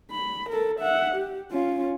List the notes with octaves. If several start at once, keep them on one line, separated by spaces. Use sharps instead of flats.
B5
A4 A#4
E5 F#5
G4
C#4 F4